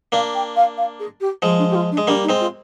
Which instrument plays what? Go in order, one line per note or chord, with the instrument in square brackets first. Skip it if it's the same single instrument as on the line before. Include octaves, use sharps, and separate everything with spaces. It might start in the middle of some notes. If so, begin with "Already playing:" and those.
[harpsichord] A#3 D4 [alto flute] F5
[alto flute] G5
F5
F5
G#4
G4
[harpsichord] F3 G#3 [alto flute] G#4
[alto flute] D4
G4
F4
D4
[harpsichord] G#3
[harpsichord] G3 A#3 [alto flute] D4
[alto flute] D#4
[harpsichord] G#3 C4
[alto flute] F4